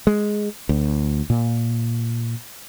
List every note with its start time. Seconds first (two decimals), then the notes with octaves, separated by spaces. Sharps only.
0.07 G#3
0.69 D2
1.30 A#2